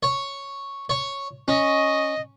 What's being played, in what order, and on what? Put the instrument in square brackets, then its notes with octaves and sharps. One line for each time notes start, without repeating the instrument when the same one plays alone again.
[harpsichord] C#5
C#5
[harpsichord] C#4 [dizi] D#5